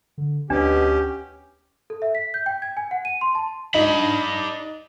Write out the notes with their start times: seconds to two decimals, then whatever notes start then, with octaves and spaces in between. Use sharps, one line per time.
0.18 D3
0.50 D2 B2 C#4 D4 G4
1.90 A4
2.02 E5
2.15 B6
2.34 G6
2.46 G5
2.62 G#6
2.77 G#5
2.91 F#5
3.05 D#7
3.21 C6
3.35 A5
3.75 D4 D#4 B5